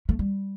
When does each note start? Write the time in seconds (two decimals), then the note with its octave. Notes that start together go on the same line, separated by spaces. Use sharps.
0.09 A3
0.19 G3